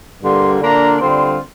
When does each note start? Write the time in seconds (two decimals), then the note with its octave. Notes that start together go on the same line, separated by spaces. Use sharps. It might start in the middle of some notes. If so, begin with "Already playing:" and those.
0.22 G2 D3 G3 A#3 C6
0.61 D3 A#3 D4 F4 A#5
0.99 D3 G3 C4 F4 C6